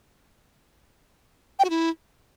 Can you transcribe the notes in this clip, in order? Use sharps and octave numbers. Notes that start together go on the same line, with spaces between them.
G5
F#4
E4